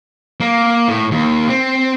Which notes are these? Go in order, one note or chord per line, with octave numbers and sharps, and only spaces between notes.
A#3
A2
D#2
C4